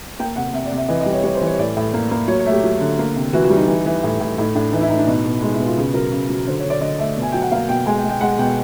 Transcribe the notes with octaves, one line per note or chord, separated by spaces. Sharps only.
A#3 G5
C3 F#5
C3 E5
D5
C3
E5
E3 D#5
D#5
G3
C#5
G3 C#5
C5
E3
C#5
A2 D5
A2
A#3
A#3
F#3 C#5
C#5
A3
G4
F#3
D3
A#3
C3
E3 F#4
F#4
G3
D#4
E3
E3
A2
A2
A2 D#4
A2 D4
E3 D#4
E4
A2 D#4
D4
B2 D#4
B2
G#3 D#4
E4
B2
F4
C#3 G#4
F#3 A#4
C#3
F#3
D3 C5
C#5
D3
D5
D3 D#5
A3 E5
B2
G#5
F#3 G5
F#5
A#3 F5
B2 G5
G#3 G#5
G5
G#3
G5
G#3 F#5
B2 G5